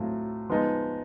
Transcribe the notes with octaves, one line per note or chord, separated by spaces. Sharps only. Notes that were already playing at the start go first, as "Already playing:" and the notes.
Already playing: A2 F#3 A3 C4 F4
F3 G#3 B3 D#4